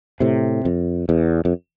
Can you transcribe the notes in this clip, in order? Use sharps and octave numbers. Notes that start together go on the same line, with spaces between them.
A2 C3
F2
E2
F2